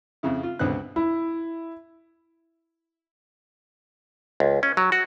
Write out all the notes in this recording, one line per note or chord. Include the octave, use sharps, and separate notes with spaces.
F2 C#3 E4
F4
C#2 B2 D3 B3 C4 F#6
E4
C#2
C#4
F#3
F#4